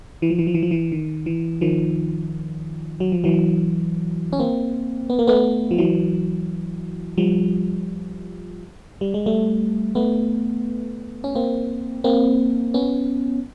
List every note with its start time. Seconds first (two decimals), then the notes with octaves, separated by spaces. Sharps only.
0.22 E3
0.30 F3
0.39 E3
0.47 F3
0.54 E3
0.63 F3
0.71 E3
0.92 D#3
1.26 E3
1.61 D#3 F3
3.00 F#3
3.12 F3
3.24 E3 F#3
4.33 C#4
4.39 A#3 C4
5.10 B3
5.19 A#3
5.27 A3 B3
5.71 F3
5.78 E3 F#3
7.18 F3 G3
9.01 G3
9.14 G#3
9.26 G3 A3
9.95 A3 B3
11.24 C#4
11.35 A#3 C4
12.04 A#3 C4
12.74 B3 C#4